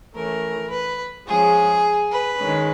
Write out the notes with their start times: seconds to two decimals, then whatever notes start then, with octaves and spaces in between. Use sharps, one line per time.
0.14 E3 A3 C#4 A#4
0.71 B4
1.27 F3 G#3 C#4 G#4
2.11 B4
2.39 D#3 G#3 C#4